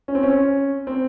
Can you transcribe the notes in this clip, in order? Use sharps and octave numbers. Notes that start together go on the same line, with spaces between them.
C#4
C4
C#4
C4